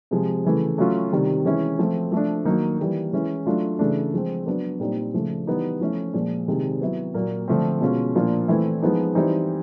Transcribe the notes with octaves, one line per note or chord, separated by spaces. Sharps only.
C3 F3 G#3
C#3 E3 A3
F#3 A3 C#4 F4
C3 D#3 G3
E3 G#3 C#4 E4
F3 A3 C4
F3 A3 D4
D#3 F#3 A#3 D#4
E3 G3 A#3
E3 G#3 C#4 E4
F#3 A3 D4 F4
C#3 E3 A3 D4
F3 G#3 C4
F#3 B3 D4
A#2 G3 C4 D#4
C#3 F3 A3
E3 G3 B3 D#4
F3 A3 C#4 E4
A#2 F3 G#3
C3 D#3 G#3
F#3 B3 E4
A#2 F#3 A#3
D3 F3 A3 C4
B2 G#3 C#4 F4
A#2 F3 A#3 D4 F4
E3 A3 C4 E4
F3 G#3 B3 D#4
E3 G3 C4 D#4